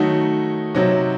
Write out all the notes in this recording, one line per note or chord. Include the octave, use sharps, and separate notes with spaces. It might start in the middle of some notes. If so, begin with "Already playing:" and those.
Already playing: D#3 F#3 A3 D#4 F#4
C3 F#3 C4 D#4 F#4